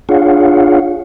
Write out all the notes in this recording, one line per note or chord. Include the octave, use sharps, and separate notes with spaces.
D4 F4 G#4 C#5 F5 F#5